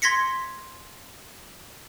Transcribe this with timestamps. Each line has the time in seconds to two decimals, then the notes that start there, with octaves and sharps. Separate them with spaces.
0.02 C6 G#6 A#6 B6 C#7